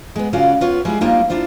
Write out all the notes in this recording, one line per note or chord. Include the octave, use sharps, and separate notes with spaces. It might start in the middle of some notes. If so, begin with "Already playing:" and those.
G#3 B3
C#3 C#4 F4 F#4 D5 F5
B3 F4 C#5
G3 G#3 E4 G#4
F3 G3 A#3 D4 D#4 F4
D4 E4 F4 C5